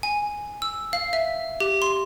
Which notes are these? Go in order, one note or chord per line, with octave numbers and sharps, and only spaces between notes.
G#5
E6
F5
E5
G4
C6